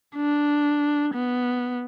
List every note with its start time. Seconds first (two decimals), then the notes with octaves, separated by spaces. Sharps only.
0.16 D4
1.15 B3